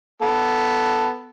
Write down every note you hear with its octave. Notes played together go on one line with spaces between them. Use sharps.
B3 A4